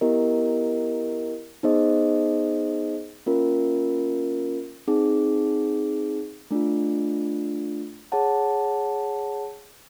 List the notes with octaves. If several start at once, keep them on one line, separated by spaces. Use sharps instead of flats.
B3 E4 G4 A#4 D#5
B3 D#4 G#4 C5 D#5
A#3 C#4 F4 A#4
C4 D#4 G#4
A3 D4 F4
G#4 C#5 F#5 A5